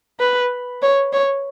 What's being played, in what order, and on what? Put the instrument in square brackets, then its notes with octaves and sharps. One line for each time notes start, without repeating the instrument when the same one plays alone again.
[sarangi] B4
C#5
C#5